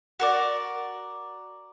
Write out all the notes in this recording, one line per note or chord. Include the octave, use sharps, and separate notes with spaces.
F#4 A#4 D5